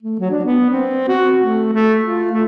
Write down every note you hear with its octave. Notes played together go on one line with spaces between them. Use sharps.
A3
F#3
D4
B3
C4
F#4
A3
A3
F4
A3